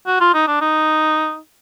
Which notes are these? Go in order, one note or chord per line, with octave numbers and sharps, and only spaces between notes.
F#4
F4
D#4
D4
D#4